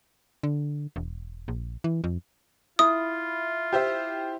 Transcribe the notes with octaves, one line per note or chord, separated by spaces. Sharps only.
D3
E1
A#1
E3
F2
E4 F4 D#6
G4 C5 E5